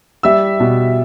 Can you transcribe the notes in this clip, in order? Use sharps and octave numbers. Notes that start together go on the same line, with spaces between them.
G3 E5 E6
B2